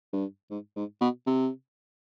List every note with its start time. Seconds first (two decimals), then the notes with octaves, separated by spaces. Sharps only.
0.13 G2
0.50 G#2
0.76 G#2
1.01 B2
1.26 C3